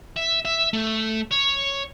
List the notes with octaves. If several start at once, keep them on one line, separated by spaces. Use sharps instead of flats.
E5
E5
A3
C#5